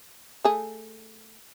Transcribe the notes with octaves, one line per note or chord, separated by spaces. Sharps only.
A3 G#4